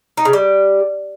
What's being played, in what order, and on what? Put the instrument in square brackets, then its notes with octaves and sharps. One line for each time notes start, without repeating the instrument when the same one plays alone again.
[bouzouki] D#4
C#3
G3